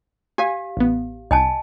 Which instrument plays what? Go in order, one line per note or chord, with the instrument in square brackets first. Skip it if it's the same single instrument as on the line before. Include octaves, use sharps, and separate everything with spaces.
[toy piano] G4 F5 [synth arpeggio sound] G#5
[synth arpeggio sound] A1 B3
[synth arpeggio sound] C2 [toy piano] D#5 G#5 A5